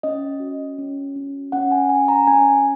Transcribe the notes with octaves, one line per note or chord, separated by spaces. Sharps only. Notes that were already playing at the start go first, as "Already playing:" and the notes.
C#4 D#5
F#4
C#4
C#4
C#4 F#5
G#5
C#4 G#5
A#5
C#4 G#5